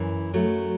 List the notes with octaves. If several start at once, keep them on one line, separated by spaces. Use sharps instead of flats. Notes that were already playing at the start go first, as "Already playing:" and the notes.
Already playing: F#2 E3
F#3 A3